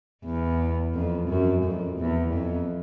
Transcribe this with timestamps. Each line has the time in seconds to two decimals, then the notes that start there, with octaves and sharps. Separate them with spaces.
0.24 E2
0.94 F2
1.29 F#2
1.64 F2
1.99 E2
2.33 F2